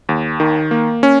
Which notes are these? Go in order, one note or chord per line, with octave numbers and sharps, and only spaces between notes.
D#2
D#3
A#3
C#4